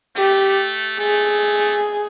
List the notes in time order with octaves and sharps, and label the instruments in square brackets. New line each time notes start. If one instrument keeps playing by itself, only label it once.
[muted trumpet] A3 [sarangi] G4
[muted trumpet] A3 [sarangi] G#4